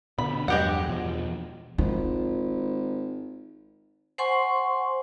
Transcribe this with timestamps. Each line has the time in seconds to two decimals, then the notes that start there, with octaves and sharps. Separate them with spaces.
0.18 B2 D3 B5
0.48 E2 G2 F#3 G#3 G4 F#5
0.89 E2 B2 F3
1.78 G#1 F4
4.18 C5 F#5 G#5 C6 C#6